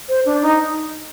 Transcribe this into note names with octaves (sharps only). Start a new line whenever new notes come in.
C5
D4
D#4